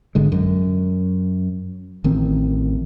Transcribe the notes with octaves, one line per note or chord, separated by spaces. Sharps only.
G#1 D3 G#3
F#2
A1 D#3 C4